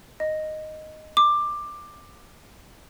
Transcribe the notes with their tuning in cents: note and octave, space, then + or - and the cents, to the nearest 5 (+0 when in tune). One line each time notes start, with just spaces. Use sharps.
D#5 -5
D6 +15